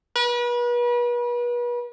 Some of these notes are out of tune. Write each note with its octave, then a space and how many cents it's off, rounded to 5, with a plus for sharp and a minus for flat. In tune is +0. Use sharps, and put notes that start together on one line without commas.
B4 -35